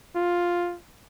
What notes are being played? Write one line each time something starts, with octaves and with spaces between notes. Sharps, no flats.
F4